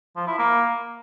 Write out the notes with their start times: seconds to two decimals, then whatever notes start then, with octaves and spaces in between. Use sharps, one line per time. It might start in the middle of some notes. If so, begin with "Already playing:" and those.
0.16 F3
0.28 E4
0.39 A#3